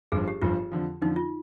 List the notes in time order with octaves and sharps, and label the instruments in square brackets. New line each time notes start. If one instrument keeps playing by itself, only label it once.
[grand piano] G1 G2 F3 [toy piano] G#4
[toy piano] G4
[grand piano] G1 G2 F3 [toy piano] F4
[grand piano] F2 D3 F3
[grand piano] F2 D3 F3 [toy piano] D#4
[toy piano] F4